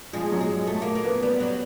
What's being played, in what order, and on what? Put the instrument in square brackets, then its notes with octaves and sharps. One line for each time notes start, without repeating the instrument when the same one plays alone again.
[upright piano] F3 [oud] G#3
[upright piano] F#3
[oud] G#3
A3
A#3
A#3
[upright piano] B3
[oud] G3 [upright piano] B3
[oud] F#3 [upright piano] B3